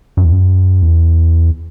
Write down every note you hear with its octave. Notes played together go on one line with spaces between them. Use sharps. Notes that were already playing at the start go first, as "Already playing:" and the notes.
F#2
E2
F#2
E2